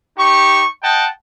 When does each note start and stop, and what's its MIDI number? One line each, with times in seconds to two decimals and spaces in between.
0.18 0.64 63
0.18 0.64 67
0.18 0.64 85
0.83 1.06 75
0.83 1.06 78
0.83 1.06 79
0.83 1.06 81